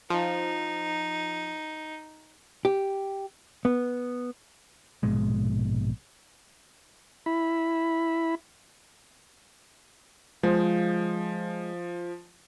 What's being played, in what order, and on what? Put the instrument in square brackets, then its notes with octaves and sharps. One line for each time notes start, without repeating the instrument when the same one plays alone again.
[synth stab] F3 [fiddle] D#4
[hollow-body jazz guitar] G4
B3
[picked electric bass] A#1 G#2 B2 G#3
[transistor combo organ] E4 B5
[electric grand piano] F3 [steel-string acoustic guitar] G#3 C5 F5